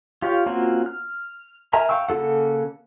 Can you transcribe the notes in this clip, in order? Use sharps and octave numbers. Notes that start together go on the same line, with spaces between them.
F4 G4 C#5 F5
A#3 C4 C#4 F4 F#4
F6
A#4 E5 G#5 A#5
F5 G5 C#6 E6
C#3 A#3 F4 A4 F#5